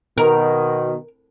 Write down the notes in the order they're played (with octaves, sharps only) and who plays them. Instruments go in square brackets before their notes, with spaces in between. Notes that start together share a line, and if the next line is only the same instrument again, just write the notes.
[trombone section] B2 D#3 [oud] A#4